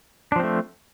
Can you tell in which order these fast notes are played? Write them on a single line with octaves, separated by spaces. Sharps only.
D4 F3 C4 A3